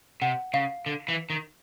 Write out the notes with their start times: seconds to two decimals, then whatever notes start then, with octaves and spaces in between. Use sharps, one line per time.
0.22 C3 F#5
0.54 C#3 F5
0.86 D3
1.08 E3
1.30 D#3